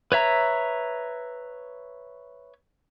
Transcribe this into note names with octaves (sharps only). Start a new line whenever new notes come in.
B4 C#5 E5 A#5